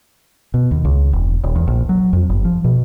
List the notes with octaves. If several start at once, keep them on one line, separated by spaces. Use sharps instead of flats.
B2
D#2
C#2
E1
D#1
E2
A#1
F#3
F2
G1
F3
B2